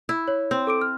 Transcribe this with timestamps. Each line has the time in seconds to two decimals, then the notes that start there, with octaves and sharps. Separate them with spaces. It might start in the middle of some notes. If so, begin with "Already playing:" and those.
0.09 E4
0.28 C#5
0.51 C4
0.67 A4 D6 D7
0.81 F6